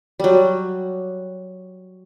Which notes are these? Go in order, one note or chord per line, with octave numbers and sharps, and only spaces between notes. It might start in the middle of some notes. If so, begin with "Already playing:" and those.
F#3 G3